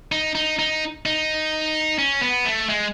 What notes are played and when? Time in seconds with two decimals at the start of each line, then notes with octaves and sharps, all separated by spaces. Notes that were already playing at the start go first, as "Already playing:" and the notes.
0.12 D#4
0.35 D#4
0.59 D#4
1.06 D#4
1.98 C#4
2.22 B3
2.46 A3
2.69 G#3